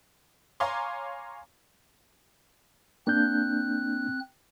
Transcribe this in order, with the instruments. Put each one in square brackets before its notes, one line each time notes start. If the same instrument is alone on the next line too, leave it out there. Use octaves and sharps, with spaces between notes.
[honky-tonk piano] C#5 F5 G#5 A#5 C6 D6
[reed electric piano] A#3 D4 G6 [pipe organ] C4 F#6